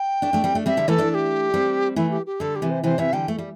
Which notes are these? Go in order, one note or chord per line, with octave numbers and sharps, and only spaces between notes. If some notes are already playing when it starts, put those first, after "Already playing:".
Already playing: G5
A3 D4
A3 D4
G3 C4
A3 D4
G3 C4 E5
D3 G3
E3 A3 A4
A3 D4
A4
G4
G3 C4
E3 A3 E4
G4
G4
D3 G3 A4
G4
C3 E3
C5
C3 E3 C5
C3 E3 E5
D3 G3 G5
A3
G3